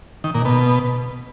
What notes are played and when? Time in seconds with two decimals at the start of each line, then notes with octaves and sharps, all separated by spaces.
0.24 D#3
0.34 A#2
0.45 B2